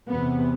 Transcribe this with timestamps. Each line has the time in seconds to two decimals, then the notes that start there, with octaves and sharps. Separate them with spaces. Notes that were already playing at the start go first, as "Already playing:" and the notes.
0.10 E2 C3 B3